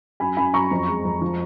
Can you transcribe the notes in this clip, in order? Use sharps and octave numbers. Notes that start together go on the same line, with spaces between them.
F#2 G#5 B5
F#2 G#5 B5
F#2 A#5 C#6
F2
G#3
F2
F3